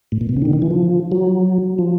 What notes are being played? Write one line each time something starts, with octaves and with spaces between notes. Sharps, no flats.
A2
A#2
B2
C#3
D#3
D3
D#3
E3
F3
F#3
F3